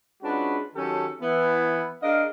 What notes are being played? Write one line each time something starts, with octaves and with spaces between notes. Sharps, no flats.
G#3 C#4 D4 F4 F#4 B4
D#3 F#3 C#4 G4 A4
E3 B3 E4
D4 G#4 A#4 D#5 F5